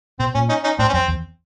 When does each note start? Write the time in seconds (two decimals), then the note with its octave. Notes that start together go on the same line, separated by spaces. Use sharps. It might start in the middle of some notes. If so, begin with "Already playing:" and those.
0.19 B2 C4
0.35 A#2 C#4
0.49 C#4 D#4
0.63 C#4 D#4
0.79 A2 C4 D4
0.88 C#4
0.93 F2 C4
1.08 E2